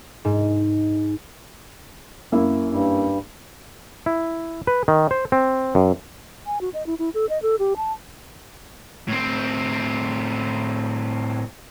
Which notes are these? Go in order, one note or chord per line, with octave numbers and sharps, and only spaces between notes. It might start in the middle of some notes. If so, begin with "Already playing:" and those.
G#2
F#2 A#3 E4
G2
E4
B4
D#3
C5
C4
F#2
G#5
F#4
D#5
E4
E4
A4
D#5
A4
G4
A5
A2 C4